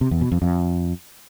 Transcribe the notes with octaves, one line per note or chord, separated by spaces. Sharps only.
C3
E2
B2
F2
F2